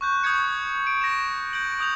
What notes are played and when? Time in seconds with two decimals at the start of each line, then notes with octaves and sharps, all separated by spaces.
0.01 C#6 F#6 G6
0.23 C#6 D#6 G6 G#6 C#7
0.87 D7
1.01 A#6 E7
1.53 G6 D7 F#7
1.80 D#6 G6 F7